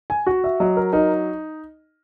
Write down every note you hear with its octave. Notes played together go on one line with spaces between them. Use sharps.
G#5
F#4 F#5
E5
F#3 D#5
A#4
D#4 A#4